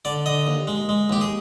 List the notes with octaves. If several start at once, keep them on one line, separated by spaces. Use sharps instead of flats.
D3 D5
D3 D#5
D#2
G#3
G#3
D#2 G4
G#4